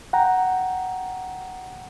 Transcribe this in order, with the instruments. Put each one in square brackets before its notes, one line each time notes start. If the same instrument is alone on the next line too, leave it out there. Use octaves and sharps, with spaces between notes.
[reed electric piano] F#5 G5 A#5